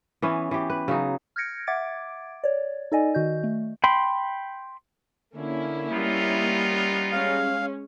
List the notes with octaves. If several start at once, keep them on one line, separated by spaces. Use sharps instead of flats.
E3 B3 C#4
E3 G4
B4
C#3 F#3 D#4
F6 G6 G#6 A#6 C#7 D7
E5 F#5 D6 G#6 A6 D7
C#5 D5
D#4 A4 D5 D#5 G#5
D#3 F#4 D#5 G6
A3
G5 B5 C6
D3 A#3 C#4 E4
G3 B3 D#4 F4
G#3 C#4 F5